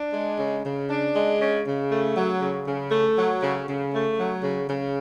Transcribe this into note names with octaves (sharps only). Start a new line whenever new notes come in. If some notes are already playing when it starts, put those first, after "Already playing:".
Already playing: D4
G#3
C#3
C#3
D4
G#3
C#3
C#3
A3
F#3
C#3
C#3
A3
F#3
C#3
C#3
A3
F#3
C#3
C#3